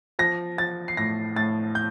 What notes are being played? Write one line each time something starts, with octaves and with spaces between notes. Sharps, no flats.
F3 A#6
F3 A6
C7
A2 A#6
A2 A6
G6